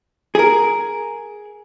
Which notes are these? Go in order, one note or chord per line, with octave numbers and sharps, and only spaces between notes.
G#4 A#4